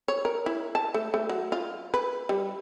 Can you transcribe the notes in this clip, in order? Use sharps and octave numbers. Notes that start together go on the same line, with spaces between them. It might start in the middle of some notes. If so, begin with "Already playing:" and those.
C#5
A#4
E4
A5
A3
A3
F#3
F4
B4
G3